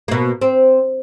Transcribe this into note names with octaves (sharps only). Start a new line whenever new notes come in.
B2 A#3
C4